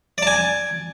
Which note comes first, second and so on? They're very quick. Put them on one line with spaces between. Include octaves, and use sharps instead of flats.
D5 A5 G#5